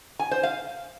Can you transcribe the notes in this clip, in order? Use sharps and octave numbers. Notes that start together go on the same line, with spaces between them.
G#5
C5
F5